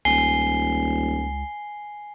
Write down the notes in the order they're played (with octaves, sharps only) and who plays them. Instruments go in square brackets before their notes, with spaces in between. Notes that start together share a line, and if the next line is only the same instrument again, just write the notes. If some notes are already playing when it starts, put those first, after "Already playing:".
[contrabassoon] D#1 [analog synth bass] C#2 [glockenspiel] G#5 C7 G7